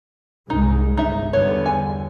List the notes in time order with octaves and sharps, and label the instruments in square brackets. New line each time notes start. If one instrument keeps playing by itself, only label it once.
[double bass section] C2 G#2 G#3 [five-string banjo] D#4
[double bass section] G1 C2 [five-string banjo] D#4 E5
[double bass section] E2 D3 G3 [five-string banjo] B3 C#5
[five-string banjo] G#5